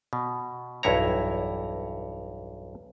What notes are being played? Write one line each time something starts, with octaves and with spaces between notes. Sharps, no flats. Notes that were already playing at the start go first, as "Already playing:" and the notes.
B2
B1 E2 G2 E4 C#5 A#5